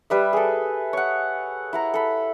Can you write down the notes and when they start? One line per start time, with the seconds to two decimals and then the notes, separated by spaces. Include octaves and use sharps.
0.10 G3 B4 E5
0.33 G#4 A4
0.93 C#5 F#5
1.73 E4 F#5 A#5
1.94 A4 B5